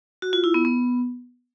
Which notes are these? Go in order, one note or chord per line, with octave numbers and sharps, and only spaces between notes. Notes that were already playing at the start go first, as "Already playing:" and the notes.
F#4
F4
E4
B3
B3